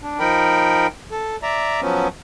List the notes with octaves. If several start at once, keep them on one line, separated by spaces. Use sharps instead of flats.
D4
F3 D#4 A#4 G5 B5
A4
D5 E5 A#5
F3 F#3 B3 C#4